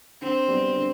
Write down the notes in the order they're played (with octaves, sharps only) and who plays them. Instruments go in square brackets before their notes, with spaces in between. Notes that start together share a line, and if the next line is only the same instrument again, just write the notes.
[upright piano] D3 [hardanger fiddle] C4
[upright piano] G3 B3 D4
D3